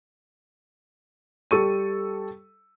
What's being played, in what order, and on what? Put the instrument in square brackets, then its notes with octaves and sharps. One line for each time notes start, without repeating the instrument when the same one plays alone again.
[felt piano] G3 A4 C#6 D#7